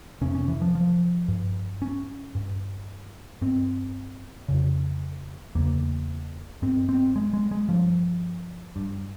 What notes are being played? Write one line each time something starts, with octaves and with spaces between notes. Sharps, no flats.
F2 C3 C#4
C#4
E3
F3
F3
G2
C#4
G2
G2 C4
F2 C#3
E2 C#3 A#3
G2 C4
C4
G#3
G#3
G#3
G2 F3
G2